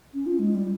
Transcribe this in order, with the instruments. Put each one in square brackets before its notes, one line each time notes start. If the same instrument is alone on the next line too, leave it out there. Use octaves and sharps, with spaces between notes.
[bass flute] C#4
F4
G#3
G3